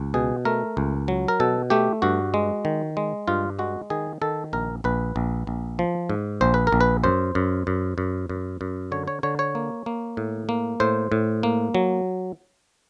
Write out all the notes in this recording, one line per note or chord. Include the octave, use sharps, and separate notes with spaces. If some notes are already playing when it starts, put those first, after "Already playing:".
Already playing: C#2
B2 G#4
A3 A#4
C#2
F#3
A#4
B2 A4
A3 G4
G2 F#4
G#3
D#3
G#3
G2 F4
G#3 F#4
D#3 G#4
D#3 A4
A#1 A#4
A#1 B4
A#1
A#1
F3
G#2
A#1 C5
B4
A#4
A#1
B4
F#2 C5
F#2
F#2
F#2
F#2
F#2
D3 C#5
C#5
D3 C#5
C#5
A#3
A#3
A2
A#3
A2 C5
A2
A#3
F#3